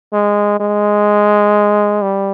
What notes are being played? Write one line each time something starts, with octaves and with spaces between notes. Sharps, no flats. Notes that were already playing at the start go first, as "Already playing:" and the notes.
G#3
G#3
G3